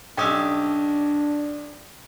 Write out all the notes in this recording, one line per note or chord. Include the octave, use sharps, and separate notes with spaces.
B1 C#4 D4 G4 G5 D#6 E6